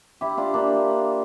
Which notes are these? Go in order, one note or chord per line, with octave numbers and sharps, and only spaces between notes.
E4 G4
D4 F4
A#3 D4